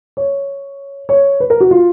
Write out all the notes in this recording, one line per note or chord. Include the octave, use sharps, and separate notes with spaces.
C#5
C#5
B4
A#4
F#4
F4